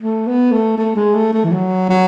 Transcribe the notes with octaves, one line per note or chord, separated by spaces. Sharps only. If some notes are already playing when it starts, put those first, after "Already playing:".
A3
B3
A3
A3
G#3
A3
A3
E3
F#3
F#3